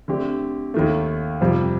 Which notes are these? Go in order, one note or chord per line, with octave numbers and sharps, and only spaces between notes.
D3 A3 C4 G4 D5
D#2 D#3 A3
F2 C3 G3